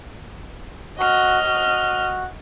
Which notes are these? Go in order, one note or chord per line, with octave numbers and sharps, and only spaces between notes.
F#4 D#5 F6
F#4